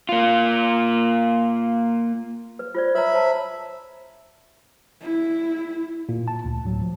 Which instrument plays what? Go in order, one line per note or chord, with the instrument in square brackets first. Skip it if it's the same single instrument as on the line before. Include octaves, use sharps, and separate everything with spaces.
[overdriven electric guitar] A#3 F4
[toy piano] B4
F4 C5 D5
[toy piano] B4 C#5 A#5 [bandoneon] E5 B5
[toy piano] C5 A5 A#5
[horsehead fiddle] E4
[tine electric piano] A#2
A5
D2
D2 A2 F#3
F3